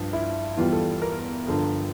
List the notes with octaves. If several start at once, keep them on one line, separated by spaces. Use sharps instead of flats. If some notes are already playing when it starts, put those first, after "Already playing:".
Already playing: G2 F3 F4
E4
E2 E3 G3 F4
A4
A#4
G2 D3 F3